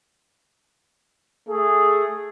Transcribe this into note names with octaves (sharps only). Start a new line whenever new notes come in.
A3 G#4